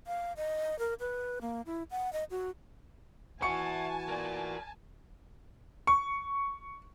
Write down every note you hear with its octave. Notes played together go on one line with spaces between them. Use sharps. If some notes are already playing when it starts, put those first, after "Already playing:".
F5
D#5
A#4
B4
A#3
E4
F#5
D#5
F#4
E3 F#4 E5 F#5 G#5 A5 C#6 C#7
A#4 D5
C#6